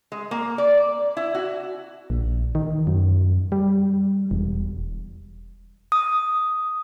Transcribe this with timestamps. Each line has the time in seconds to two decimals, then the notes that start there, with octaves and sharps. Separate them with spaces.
0.12 G#3
0.31 A#3
0.58 D5
1.17 E4
1.35 F#4
2.10 A#1
2.55 D#3
2.87 F#2
3.52 G3
4.31 E1
5.92 D#6